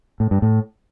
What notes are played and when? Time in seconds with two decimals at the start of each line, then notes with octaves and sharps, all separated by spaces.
0.20 A2
0.31 G2
0.42 A2